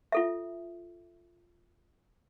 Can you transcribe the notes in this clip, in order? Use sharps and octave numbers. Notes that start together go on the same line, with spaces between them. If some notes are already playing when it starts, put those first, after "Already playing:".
F4 A4 E5